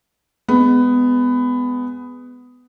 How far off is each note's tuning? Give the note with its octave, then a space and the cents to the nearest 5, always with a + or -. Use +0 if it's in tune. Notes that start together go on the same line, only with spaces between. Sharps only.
G#3 +0 B3 +15